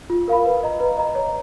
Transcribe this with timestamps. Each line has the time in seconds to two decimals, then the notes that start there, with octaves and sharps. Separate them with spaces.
0.10 F4
0.28 A#4 F5 B5
0.46 B4
0.63 D#5 A#5
0.80 B4
0.97 D#5 A#5
1.15 C#5